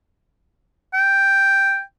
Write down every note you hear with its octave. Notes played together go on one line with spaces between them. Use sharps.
G5